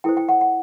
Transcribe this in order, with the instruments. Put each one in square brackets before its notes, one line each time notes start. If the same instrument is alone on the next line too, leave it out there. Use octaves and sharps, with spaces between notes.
[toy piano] E4 A4 C5 G5
G5
F#5
F#5